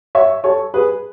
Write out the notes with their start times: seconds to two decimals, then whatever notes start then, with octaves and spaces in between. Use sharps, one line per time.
0.15 C#5 E5
0.44 A4 C#5
0.74 G#4 B4